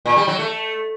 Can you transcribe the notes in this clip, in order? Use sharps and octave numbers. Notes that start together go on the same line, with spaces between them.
A#2
G3
F#3
A3